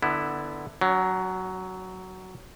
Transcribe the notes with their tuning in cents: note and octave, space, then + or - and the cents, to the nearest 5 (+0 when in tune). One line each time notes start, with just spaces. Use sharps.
D3 +20 B3 +0 E4 +0
F#3 +10 C#4 +45